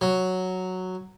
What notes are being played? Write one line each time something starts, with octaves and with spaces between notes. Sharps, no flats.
F#3